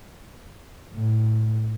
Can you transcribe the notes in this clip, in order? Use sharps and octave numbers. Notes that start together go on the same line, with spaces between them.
A2